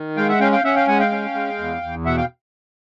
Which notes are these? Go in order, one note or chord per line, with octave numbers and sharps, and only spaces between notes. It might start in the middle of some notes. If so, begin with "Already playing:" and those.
Already playing: D#3
G#3 F5 G5
E5 F#5
C#4 F5 G5
F5 G5
C#4 E5 F#5
F5 G5
G#3 F#5 G#5
F5 G5
C#4
G#3
E2
E2
B2 E5 F#5
F5 G5